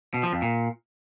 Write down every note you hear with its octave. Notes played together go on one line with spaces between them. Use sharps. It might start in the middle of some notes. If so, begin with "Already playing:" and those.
B2
F3
F2
A#2